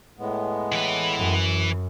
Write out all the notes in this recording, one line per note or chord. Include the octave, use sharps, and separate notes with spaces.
A2 G#3 B3
E3 B4
F#2